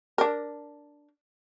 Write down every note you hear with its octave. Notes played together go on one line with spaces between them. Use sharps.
D4 A#4